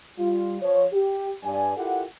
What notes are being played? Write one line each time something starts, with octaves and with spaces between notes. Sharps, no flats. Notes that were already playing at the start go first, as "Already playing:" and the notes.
G3 F4
F3 C#5
G4
G2 D5 G#5
E4 F4 G4 A4 A#4 F#5